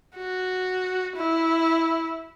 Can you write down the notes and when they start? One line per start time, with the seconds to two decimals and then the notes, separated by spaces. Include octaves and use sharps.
0.17 F#4
1.16 E4